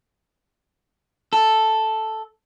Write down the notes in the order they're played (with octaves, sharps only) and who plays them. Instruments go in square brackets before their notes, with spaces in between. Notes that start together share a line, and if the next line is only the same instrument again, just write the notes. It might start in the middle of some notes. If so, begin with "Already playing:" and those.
[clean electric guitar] A4